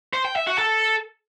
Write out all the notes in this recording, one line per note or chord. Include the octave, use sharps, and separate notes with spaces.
C5
G5
E5
F#4
A4